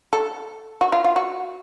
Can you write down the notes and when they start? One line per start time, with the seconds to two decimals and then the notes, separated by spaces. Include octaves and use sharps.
0.13 A4
0.81 F#4
0.92 F4
1.04 F4
1.16 F#4